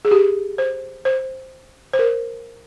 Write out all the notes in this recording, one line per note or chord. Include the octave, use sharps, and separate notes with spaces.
G#4
G4
C5
C5
C5
A#4